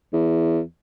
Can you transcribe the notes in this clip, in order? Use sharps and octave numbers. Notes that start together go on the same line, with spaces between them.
E2